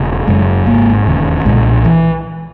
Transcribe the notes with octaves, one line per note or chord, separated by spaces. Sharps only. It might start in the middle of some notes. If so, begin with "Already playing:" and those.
Already playing: E1 C#3
F#1 F#2 C#3 G#3
G#1 G#2 A#3
E1 D#2 C#3
B1 A#2 G#3
E3